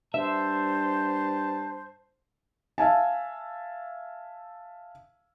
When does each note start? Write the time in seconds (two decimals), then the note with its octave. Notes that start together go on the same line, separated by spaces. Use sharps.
0.14 G2 C5 E5 A5
2.78 E5 F5 G#5 A5